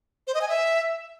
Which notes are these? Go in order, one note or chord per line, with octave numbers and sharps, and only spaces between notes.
C5
D#5
G#5
E5